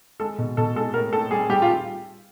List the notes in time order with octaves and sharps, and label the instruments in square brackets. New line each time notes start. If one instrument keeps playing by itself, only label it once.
[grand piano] G#3 A4
B2
B2 A4
G#3 A4
A2 A#4
A2 A4
G3 G#4
G3 G4
F4